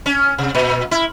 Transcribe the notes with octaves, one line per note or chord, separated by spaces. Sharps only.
C#4
C3
A#2
E4